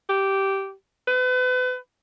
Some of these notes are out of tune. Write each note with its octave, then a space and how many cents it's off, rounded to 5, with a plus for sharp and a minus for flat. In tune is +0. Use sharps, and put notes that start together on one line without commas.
G4 -10
B4 +35